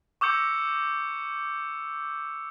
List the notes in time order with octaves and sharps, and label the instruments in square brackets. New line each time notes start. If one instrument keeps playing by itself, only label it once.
[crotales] C#6 D6 E6 G6 C#7